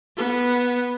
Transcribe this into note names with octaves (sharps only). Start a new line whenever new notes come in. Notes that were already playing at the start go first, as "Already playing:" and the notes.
B3